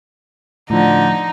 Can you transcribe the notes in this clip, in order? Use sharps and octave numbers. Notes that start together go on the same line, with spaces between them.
A2 D3 F3 D#4